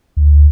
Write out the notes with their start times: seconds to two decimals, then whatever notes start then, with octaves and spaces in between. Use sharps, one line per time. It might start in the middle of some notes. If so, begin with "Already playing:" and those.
0.17 D2